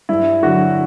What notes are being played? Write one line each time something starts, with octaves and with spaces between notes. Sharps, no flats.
G2 E4
D3 F#3 F#4